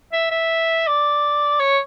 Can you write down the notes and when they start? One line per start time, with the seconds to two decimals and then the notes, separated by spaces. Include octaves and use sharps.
0.13 E5
0.31 E5
0.87 D5
1.60 C#5